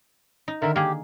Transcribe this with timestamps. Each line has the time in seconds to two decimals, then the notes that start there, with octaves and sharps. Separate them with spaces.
0.48 D#4
0.62 D3 D#3 A#4 E5
0.76 A#3 G4 G#4